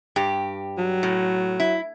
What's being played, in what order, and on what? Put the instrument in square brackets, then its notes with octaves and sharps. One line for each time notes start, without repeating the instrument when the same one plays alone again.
[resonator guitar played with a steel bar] G2 G4
[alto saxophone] F#3
[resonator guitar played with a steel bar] A2
E4